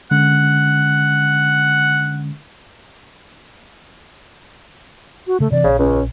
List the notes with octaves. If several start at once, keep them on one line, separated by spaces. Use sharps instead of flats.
D3 G#3 C#4 F#5
F#4
C#3 A3
C3 E3 C4 D5
A#1 C#3
C#2 C#4